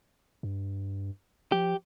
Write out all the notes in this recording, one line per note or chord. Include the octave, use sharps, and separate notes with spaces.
G2
F3 G4